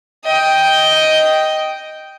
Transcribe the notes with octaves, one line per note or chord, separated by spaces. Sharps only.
D#5 G5